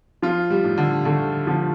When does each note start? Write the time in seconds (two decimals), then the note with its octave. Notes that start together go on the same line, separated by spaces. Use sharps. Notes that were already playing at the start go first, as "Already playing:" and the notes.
0.22 F3 F4
0.50 G3
0.64 A2
0.78 D3
1.05 D3 A3
1.47 D3 F3